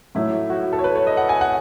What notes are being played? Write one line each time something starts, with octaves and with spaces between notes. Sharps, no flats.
A2 F#3 A3 E4
F#4
A4
C#5
B4
C#5
D#5
F#5
G#5
F#5